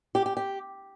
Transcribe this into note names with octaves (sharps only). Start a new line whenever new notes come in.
G4
G4
G4